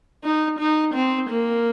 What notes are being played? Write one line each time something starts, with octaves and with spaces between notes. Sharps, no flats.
D#4
D#4
C4
A#3